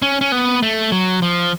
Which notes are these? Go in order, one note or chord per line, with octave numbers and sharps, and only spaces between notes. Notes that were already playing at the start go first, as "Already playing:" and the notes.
C#4
C#4
B3
A3
F#3
F3